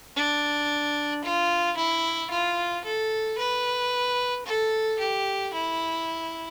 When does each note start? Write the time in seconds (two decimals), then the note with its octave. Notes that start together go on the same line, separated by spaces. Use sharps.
0.16 D4
1.24 F4
1.77 E4
2.31 F4
2.84 A4
3.38 B4
4.46 A4
4.99 G4
5.53 E4